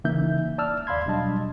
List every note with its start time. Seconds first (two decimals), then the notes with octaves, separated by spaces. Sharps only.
0.04 C#3 E3 A#3 D#4 E5 G6
0.58 D5 A5 E6 F6
0.87 D#2 D5 F5 B5 C6 G#6
1.05 B2 F#3 G3 D4 D#5 A5